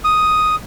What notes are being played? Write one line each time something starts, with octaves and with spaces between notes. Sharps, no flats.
D#6